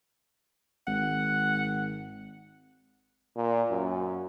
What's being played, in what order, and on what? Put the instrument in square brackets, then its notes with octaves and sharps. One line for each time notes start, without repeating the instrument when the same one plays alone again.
[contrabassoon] G#1 [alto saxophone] F#5
[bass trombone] A#2
F#2